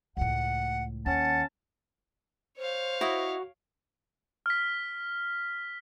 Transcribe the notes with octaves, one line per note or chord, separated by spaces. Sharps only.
C#2 A2 F#5
D#2 C#4 F#5 A5
C5 C#5 F5
E4 F#4 D#5
F6 B6